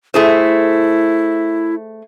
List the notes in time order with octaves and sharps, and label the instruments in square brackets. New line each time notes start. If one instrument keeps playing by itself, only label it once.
[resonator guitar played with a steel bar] A3 G#4 C5 [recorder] E4